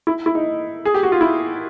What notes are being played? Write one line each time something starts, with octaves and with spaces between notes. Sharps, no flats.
E4
E4
D#4
G#4
G4
F#4
F4
E4